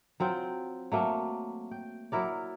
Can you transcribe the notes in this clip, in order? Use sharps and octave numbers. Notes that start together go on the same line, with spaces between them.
F#3 C4 F4 G5
F#3 A3 A#3
G5
F#3 E4 A#4 D5